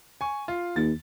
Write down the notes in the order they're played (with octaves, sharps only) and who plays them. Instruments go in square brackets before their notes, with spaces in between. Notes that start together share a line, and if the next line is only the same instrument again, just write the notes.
[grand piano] G#5 C#6
F4
[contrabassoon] D#2 [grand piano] A6